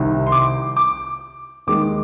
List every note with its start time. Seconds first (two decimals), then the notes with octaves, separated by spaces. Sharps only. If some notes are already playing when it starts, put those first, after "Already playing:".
Already playing: C2 C3 D#3
0.27 C6
0.32 D6
0.77 D6
1.67 D#2 D#3 G#3 D6